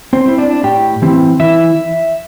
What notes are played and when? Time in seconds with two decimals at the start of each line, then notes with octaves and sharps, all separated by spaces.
0.13 C4 C5
0.26 C4 E4
0.38 D4 D5
0.63 A2 G4 G5
1.02 E3 C4 E4
1.40 E3 E4 E5